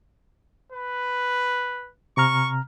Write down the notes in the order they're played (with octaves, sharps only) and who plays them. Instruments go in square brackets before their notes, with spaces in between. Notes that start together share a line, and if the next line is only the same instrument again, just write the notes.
[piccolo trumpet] B4
[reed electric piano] C3 A#5 F6 [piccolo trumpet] C#6